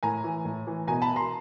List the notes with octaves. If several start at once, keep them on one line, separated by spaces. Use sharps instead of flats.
A2 G#5 A#5
E3
A2
E3
B2 G#5 A#5
A5 B5
A#5 C6